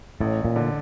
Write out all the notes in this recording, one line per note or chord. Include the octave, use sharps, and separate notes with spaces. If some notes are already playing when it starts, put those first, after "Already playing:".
A1 A2
A#2
D3